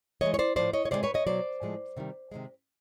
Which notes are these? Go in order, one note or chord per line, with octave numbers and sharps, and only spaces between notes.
A2 E3 G#3 C#5 D#5
C#5
C5 D5
A2 F3 G#3 C5 D5
C#5 D#5
C#5
C3 F3 G#3 C5 D5
B4 C#5
C#5 D#5
B2 F#3 C5 D5
A2 F3 G#3
C3 D#3 G3
C3 D#3 G#3